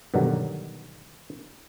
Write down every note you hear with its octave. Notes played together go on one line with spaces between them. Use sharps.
G2 B2 D3 D#3 F#3